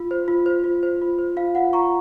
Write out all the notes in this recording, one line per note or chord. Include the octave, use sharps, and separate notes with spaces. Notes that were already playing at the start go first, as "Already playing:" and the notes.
Already playing: F4
C5
F4
C5
F4
C5
F4
C5
F4 F5
F4 F#5
F4 A#5 C#6